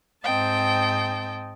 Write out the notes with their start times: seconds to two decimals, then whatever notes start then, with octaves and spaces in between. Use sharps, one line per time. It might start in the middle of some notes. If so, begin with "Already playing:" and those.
0.23 G#2 C4 D#5 G5 A5